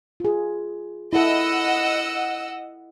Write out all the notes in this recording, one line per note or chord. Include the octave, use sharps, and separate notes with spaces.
F4 G#4
E4 A4 D#5 F#5 E6